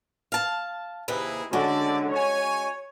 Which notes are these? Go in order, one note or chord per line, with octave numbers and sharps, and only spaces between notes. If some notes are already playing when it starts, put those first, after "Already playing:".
F5 A5
D#2 C3 D#4 E4 G#4 B4
D3 G#3 C#4 F#4 D5
C#5 G#5